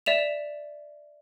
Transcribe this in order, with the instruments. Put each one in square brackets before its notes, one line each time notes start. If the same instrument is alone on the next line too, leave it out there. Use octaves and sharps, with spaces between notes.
[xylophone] D5 E5 E7 F7